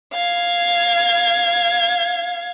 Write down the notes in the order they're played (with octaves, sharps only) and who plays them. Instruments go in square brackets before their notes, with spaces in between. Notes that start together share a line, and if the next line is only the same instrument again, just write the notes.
[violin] F5 G#6